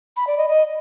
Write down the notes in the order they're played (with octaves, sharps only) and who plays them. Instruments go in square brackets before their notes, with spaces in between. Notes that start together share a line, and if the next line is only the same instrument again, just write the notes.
[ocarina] B5
D5
D#5
D#5